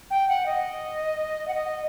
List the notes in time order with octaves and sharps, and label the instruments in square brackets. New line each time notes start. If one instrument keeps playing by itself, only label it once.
[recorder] G5
F#5
D#5
F#5
D#5